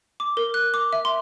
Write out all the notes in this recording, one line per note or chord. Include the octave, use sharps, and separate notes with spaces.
D6
A#4
F#6
D6
E5
C6